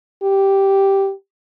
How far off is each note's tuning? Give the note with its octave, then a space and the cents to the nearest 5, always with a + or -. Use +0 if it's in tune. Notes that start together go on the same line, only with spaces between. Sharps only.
G4 -5